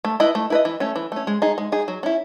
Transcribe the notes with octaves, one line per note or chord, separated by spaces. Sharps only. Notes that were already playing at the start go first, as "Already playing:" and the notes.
A3
E4 B4 D#5
A3
E4 B4 D#5
E3
A3 C#4
E3
A3 C#4
G#3
D#4 G#4
G#3
D#4 G#4
F#3
C#4 E4